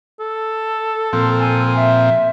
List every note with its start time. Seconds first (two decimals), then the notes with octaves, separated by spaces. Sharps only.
0.20 A4
1.13 A#2 F3 C4
1.38 G#5
1.76 E5